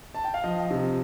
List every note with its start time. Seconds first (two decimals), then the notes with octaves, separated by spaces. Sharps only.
0.15 A5
0.24 G5
0.34 F5
0.44 F3 D#5
0.71 C3